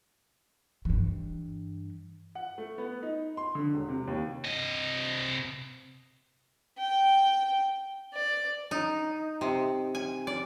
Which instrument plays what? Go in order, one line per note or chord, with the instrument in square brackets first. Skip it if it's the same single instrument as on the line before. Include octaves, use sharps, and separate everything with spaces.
[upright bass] G2 E3
[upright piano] F#5
A3
B3
D#4
C6
D3
E1
C3
D#2
[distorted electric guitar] C3 D#5
[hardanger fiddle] G5
D5
[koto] D#4
C3
G#5
D5